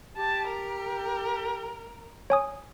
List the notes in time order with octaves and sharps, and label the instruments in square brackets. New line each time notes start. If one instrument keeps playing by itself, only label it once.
[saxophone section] G4 [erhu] A5
[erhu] A#4
[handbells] C#5 G#5 D#6